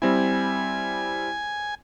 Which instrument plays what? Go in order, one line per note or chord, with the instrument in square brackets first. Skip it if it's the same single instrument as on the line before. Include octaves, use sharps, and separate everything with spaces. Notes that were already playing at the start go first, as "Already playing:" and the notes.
[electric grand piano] G3 C4 E4 [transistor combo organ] G#5